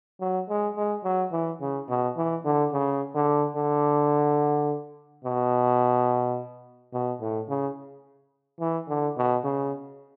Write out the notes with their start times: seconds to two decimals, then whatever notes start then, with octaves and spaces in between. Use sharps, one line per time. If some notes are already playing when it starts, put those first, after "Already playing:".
0.20 F#3
0.49 G#3
0.76 G#3
1.04 F#3
1.32 E3
1.61 C#3
1.89 B2
2.17 E3
2.45 D3
2.72 C#3
3.15 D3
3.56 D3
5.25 B2
6.93 B2
7.21 A2
7.48 C#3
8.60 E3
8.88 D3
9.17 B2
9.44 C#3